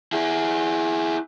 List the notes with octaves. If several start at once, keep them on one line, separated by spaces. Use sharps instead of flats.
E4 G#4